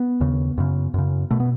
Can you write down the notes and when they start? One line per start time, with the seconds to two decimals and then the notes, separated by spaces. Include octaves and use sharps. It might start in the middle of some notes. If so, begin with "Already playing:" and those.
Already playing: B3
0.20 D#2 C#3
0.58 F#2 C#3
0.94 F#2 C#3
1.31 B2 A3
1.40 B3